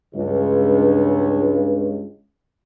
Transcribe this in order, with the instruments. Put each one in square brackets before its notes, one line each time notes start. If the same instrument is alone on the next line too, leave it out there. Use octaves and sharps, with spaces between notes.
[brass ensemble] C#2 G2